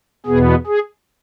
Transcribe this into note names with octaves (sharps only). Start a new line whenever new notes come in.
E2 B2 B3 G#4
G#4